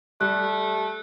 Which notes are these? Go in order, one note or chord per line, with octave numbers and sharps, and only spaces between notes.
G3 A3 F#6